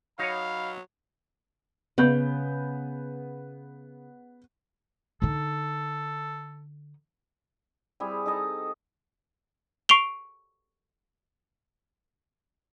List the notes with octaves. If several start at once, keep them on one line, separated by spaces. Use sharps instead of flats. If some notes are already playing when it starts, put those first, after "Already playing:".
F#3 D#4 C#5 F5 B5
C#3 B3 G6
D3 D#4 A4
G3 C4 E4 G#4
D#4 A4 D#5
C#6 C7 D7 F7 G7